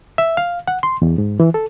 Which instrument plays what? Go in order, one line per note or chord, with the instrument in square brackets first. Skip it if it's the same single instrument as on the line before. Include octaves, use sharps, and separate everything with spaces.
[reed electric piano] E5
F5
F#5
C6
E2
G#2
E3
A4